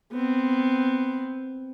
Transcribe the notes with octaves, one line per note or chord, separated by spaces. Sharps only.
B3 C4